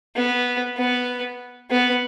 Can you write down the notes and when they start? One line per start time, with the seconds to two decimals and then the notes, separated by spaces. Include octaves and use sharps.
0.16 B3
0.78 B3
1.70 B3